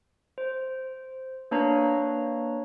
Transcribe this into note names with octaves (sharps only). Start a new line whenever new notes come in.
C5
A#3 D4 B4 C#5 F5 A#5